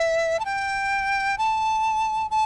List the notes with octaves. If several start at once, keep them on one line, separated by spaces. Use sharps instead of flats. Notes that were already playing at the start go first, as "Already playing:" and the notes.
Already playing: E5
A5
G5
A5
A5